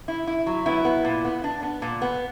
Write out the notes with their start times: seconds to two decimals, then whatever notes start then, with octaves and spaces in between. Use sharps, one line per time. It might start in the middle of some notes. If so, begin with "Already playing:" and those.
0.08 E4
0.27 E4
0.47 F#3
0.66 B3 E4
0.85 B3
1.05 A#2
1.24 B3
1.44 D4
1.63 B3
1.82 A#2
2.02 B3